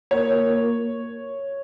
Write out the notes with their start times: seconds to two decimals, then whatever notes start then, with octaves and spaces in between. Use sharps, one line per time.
0.11 A#3 F4 A#4 C#5